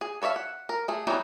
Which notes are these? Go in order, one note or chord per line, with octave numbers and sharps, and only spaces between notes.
G#4
A4 C#5 D5 E5 F5
F#5
A#4
A3 G#4
E3 F#3 G3 B3 D#4